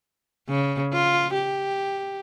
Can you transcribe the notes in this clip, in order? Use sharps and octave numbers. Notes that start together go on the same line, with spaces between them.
C#3
F4
G4